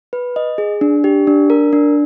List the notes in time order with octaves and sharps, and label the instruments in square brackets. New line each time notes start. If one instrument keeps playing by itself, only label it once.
[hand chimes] B4
D#5
G#4
D4
G4
D4
A#4
D4